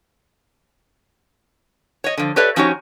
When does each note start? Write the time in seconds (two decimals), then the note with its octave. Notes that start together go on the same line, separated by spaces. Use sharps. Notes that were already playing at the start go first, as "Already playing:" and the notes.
2.04 C#5 D#5
2.18 D3 F3
2.36 G4 A4 B4 C#5 D5 E5
2.56 F3 C#4 D#4 F#4 G4 C#5